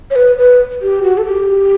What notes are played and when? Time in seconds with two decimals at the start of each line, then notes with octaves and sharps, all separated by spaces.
0.11 C#5
0.16 B4
0.38 B4
0.82 G4
1.03 F#4
1.18 A4
1.26 G4